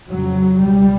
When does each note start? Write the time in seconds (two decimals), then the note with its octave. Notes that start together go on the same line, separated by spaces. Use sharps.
0.10 F2 C#3 F#3
0.61 C#2 B2 G3